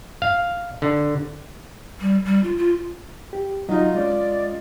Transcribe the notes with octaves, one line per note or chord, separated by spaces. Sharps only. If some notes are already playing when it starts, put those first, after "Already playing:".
F5
D3
G3
G3
F4
F4
G4
F#3 D#4 F4 F#4 D#5
G#3 C#4 D5